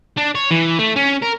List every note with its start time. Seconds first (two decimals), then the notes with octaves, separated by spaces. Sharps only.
0.17 D4
0.35 C#5
0.51 E3
0.79 A3
0.96 C#4
1.22 A#4